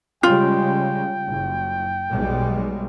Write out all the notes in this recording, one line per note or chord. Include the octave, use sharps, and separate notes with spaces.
C#3 G3 G#3 F4 G5
F#1
B1 G3 G#3